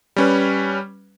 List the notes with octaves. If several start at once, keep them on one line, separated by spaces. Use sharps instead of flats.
G3 C#4 B4